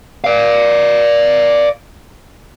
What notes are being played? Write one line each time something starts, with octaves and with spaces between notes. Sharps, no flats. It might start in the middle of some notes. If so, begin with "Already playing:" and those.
D5 F5